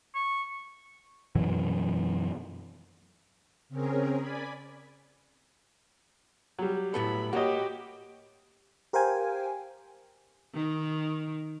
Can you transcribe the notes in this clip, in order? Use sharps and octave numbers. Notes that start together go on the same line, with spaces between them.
C#6
F#2 B2 E3 F#3
C#3 C4 C#4 G#4 A#4
D5 G#5 B5
F#3 G3
A2 B3 A4 B5
A#3 F#4 G4 C#5 D#5
G4 A#4 C5 F5 G5 G#5
D#3